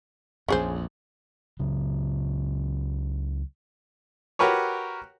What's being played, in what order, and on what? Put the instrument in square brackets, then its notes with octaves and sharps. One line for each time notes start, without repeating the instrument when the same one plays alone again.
[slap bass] A#1 F2 [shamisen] C#4 G#4 C5
[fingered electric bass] C#2 C#3 F#3
[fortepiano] F#4 G4 A#4 B4 C#5